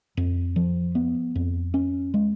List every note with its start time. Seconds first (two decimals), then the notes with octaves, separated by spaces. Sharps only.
0.17 F2
0.56 F3
0.95 B3
1.36 F2
1.74 C#4
2.14 G#3